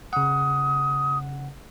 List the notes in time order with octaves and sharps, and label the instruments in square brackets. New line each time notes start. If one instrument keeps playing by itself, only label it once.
[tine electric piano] C#3 F#5 [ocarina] D#6